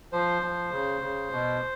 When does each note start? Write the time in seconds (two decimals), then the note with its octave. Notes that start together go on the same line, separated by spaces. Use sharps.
0.12 F3 C5
0.42 F3
0.71 C#3
1.01 C#3
1.31 B2